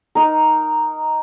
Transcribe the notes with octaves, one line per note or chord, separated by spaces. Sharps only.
D#4 A#4